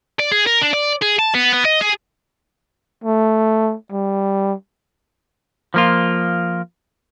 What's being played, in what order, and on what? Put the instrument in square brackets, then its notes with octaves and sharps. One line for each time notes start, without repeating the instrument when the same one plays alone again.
[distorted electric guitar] D5
G#4
A#4
D4
D5
G#4
A5
B3
B3
D#5
G#4
[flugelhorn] A3
G3
[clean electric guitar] F3 A#3 F4